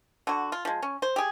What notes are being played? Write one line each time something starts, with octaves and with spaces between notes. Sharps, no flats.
D3 F#4
F4
F3 G#3
C#4
C5
G4 G#4